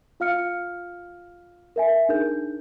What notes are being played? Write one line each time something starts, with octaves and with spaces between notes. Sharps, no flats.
F4 F5 F6 C#7
A#4 E5 G#5
D4 D#4 G#4 A#4 G6